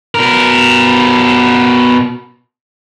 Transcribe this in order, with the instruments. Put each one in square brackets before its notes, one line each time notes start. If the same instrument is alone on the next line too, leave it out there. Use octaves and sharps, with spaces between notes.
[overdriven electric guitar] B2 A#4